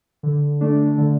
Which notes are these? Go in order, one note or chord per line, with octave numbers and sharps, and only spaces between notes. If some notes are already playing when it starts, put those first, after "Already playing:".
D3
A3 D4
D3